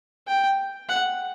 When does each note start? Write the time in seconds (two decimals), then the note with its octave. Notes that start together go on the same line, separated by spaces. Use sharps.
0.28 G5
0.89 F#5